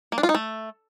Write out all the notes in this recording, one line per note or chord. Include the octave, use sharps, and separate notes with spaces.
A#3
D4
F4
D#4
A3